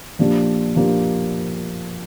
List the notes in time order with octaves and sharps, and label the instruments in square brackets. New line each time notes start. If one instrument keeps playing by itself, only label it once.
[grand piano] A#2 F3 A#3 D4 G4
A#2 F3 A#3 D4 G4